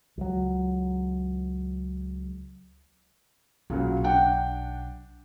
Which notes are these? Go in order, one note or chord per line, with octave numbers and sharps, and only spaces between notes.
C#2 F#3
B1 A#2 C#3 F#3
D4 F#5 G5